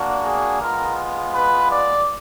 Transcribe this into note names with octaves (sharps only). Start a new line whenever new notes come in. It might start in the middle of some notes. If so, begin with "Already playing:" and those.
Already playing: A#3 D4 F#4
G#4
G#3 B3 F4 A#4
B4
D5